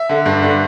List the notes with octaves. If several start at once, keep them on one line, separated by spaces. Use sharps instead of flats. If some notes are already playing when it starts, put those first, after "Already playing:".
Already playing: E5
D3
G2
D3